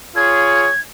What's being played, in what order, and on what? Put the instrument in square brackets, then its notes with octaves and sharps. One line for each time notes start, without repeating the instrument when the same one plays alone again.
[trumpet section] F4 G#4 C#5 [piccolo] G#6